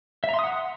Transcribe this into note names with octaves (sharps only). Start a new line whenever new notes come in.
E5
A#5
C6
D#6
F#5